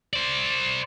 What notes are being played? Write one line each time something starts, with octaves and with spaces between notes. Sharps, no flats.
C5 D5